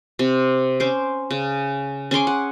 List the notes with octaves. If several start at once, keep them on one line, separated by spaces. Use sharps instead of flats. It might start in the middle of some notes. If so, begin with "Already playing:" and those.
C3
C#4 C5 D6
C#3
C#4 G#4 C6 D6
F#5